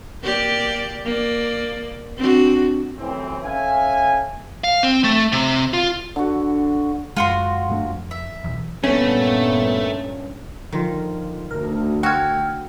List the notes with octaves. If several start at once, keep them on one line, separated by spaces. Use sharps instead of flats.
A#3 G4 D5
A#3 D5
C4 D4 F#4
C2 F#2 A2 E3 C4
C#4 A4 E5 F5 G#5
F5
C4
A3
C3
F4
D3 F#4
F#2 G#3 F4 F#4 C6
G2 A3 D4
F2
E5
B1 E2
G2 A#2 A3 B3 C#4
D3 D#3 F3 F4
D2 A#4
F#4 G5 E6 F6 G#6